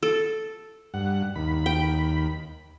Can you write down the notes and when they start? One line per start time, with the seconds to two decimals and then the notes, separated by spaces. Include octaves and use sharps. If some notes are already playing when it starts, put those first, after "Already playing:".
0.03 A4
0.94 G2 F#5
1.36 D#2 B5
1.66 G5